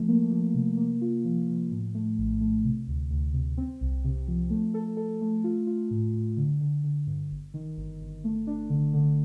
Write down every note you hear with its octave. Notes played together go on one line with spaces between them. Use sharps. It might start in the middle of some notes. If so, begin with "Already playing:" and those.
Already playing: F3 A3
A#3
F3
C3
A#3
F4
F3
F3
A2
A3
A#1
A3
C3
D2
D2
C3
C4
C2
C3
F3
A3
A4
A4
A3
F4
F4
A2
A2
D3
D3
D3
G2
G1
D#3
G1
G1
A3
D4
D3
D3